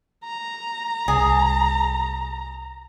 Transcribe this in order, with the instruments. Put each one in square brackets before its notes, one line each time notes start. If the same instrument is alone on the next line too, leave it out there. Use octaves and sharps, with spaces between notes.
[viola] A#5
[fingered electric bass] C2 [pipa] G#4